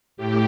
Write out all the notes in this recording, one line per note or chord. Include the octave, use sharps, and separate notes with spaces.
A2 G4